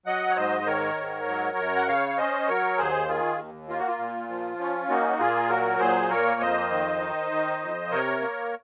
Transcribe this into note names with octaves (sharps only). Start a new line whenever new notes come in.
F#3 D#5 F#5
C#5
G#2 C5 D#5
C5
D#3 A#4 C#5
G#2
F#3
F#2
F#5
C#3 C#5 F5
F5
C#4 C5 D#5
F#3 A#4 C#5
D#2 G#4 C5
D#3 F4 G#4
D#2
A#3 F4
F#4
F4
A#2
F3
C#4
A#3 D#4 F#4
A#2 F4 G#4
F#3 F#4 A#4
A#2 G#4 C5
A#3 A#4 C#5
F2 C5 D#5
D#3
D#4
D#3
F2
C3 A#4 C#5
A#3